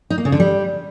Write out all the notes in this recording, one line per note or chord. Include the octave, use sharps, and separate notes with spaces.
D#4
A#3
C#3
D3
G3